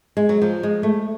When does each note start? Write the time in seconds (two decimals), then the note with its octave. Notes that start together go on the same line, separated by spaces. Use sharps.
0.17 G#3
0.29 F#3
0.42 F3
0.63 G#3
0.83 A3